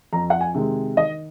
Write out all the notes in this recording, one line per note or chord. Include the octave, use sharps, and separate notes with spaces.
F2 A#5
F#5
G#5
C3 D#3 G#3
D#3 D#5